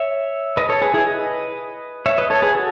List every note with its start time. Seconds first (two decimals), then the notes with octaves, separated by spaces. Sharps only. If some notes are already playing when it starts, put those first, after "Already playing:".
Already playing: C#5 E5
0.57 B4 D#5
0.69 A4 C#5
0.82 G#4 B4
0.94 E4 G#4
1.07 B4 D#5
2.06 C#5 E5
2.18 B4 D#5
2.30 A4 C#5
2.42 G#4 B4
2.55 F#4 A4